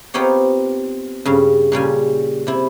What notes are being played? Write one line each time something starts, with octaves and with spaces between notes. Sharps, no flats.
B3 C4 D#4 F4 G4 C#5
G2 C#3
A#2 C#3 G3 G#5
C3 E4